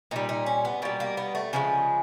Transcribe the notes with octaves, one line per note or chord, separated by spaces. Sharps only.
A#2 G3 D#4
D#4
C#4
B3
B2 G3 A#3
A#3
B3
A3
C#3 F3 G#3 A#3